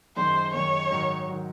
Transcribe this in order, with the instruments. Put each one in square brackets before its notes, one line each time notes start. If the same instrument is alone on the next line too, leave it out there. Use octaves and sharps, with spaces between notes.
[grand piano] F#2 D#3 G#3 D#4 [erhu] C5
[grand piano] F#2 D#3 G#3 D#4 [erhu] C#5
[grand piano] G#2 D#3 F#3
D#3 F#3